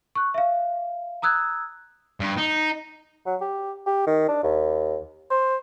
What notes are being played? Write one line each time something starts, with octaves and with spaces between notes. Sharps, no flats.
C#6 F#6
E5 F5
A#5 D#6 E6 F#6 G#6
G2
D#4
F#3
G4
G4
D#3
D4
D#2
C5